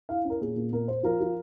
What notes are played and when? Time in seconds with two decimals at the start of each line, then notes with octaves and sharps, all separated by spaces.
0.09 E4 F5
0.25 C#4
0.30 A#4
0.41 A#2 G#4
0.56 A#2
0.72 A#2 A#4
0.88 A#3 C5
1.03 F3 A#4
1.20 F3